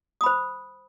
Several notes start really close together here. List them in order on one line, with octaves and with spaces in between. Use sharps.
D#6 B5 C5